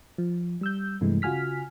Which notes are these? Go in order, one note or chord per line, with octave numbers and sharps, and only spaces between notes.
F3
G3 E6 G6
G2 C3 E3 G#3 A3
C#3 F4 F#4 G#5 F6 B6